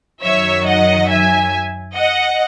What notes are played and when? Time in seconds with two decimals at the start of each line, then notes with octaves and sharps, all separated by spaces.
0.23 F#2 D#3 F#3 C#5 E5
0.67 D#5 F#5
1.09 E5 G#5
1.96 D#5 F#5